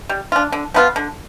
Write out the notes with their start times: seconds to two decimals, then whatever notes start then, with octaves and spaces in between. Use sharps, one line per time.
0.09 G3
0.32 D4 F4
0.52 D3
0.74 F3 B3 F4
0.96 D3